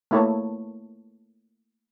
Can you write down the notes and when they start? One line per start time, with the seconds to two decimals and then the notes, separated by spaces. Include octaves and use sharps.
0.11 A3 A#3 E4 A4 C#5